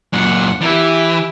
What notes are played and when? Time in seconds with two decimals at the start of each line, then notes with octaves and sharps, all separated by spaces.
0.13 F#2 A#2 F#5
0.61 E3 E4 G4